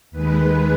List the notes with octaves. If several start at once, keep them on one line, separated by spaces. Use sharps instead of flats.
D#2 D#3 G#3 B4